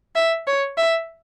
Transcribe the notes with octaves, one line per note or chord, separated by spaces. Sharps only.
E5
C#5
E5